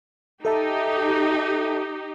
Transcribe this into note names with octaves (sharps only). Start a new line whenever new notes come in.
D#4 G4 A4 E5 A5